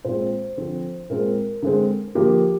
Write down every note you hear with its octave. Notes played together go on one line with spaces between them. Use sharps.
A#2 G#3 C4 C5
D3 F3 C4
A#2 G#3 C4 A#4
D3 G#3 C4
D3 F3 A#3 G4